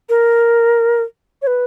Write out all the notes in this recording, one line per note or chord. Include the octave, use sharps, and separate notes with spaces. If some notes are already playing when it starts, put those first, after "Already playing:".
A#4
C#5
B4